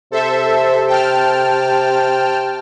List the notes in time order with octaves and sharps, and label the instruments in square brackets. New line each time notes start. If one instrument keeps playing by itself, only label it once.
[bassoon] C3 [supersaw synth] A4 C5 E5
[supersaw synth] G5 A5 F6